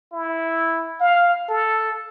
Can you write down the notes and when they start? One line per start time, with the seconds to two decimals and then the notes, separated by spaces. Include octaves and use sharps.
0.12 E4
1.00 F5
1.48 A4